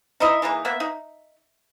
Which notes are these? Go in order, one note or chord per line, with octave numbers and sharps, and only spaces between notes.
D#4 E4 D#5 E5
E3 G#3 A#3 D#4
A#3 B3 E5
D#4